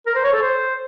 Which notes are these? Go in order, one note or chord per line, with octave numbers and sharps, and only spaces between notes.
A#4
C5
C#5
A4
C5